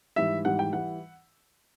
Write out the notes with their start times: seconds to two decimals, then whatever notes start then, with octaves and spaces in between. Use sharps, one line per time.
0.16 G#2 E3 G3 E5
0.45 G#2 E3 G3 F#5
0.59 G5
0.73 E3 G3 F#5